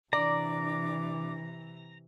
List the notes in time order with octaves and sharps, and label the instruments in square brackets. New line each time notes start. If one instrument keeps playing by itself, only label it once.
[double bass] C3 E3 [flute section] D4 D6 [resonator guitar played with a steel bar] D5 [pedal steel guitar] A#5